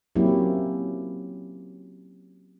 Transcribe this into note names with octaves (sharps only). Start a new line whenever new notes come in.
F#3 A#3 C4 C#4 E4 G4